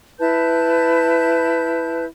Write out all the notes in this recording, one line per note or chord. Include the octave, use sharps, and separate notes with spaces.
E4 B4 A5 G6